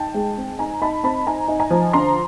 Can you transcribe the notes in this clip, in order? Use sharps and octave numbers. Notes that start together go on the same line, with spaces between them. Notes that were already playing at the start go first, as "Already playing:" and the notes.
Already playing: D#4 G5 A5
G#3
C4
D#4 G#5 A#5
D#4 A5 B5
C4 A5 B5
D#4 G#5 A#5
D#4
G#5 A#5
F3
D3 A#5 C6